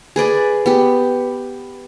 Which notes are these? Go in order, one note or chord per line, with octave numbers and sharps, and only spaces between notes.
G#4 B4 D5 G#5
B3 G4